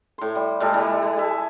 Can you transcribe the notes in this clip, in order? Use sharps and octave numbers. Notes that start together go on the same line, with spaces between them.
A2 C6
G3
A#2 G3 G#3 A4
E3 G3
G3
G#4 E5 A5